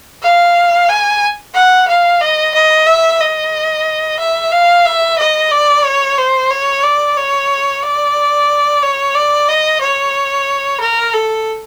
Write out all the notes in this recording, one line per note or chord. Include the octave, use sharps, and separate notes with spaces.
F5
G#5
F#5
F5
D#5
D#5
E5
D#5
E5
F5
E5
D#5
D5
C#5
C5
C#5
D5
C#5
D5
C#5
D5
D#5
C#5
A#4
A4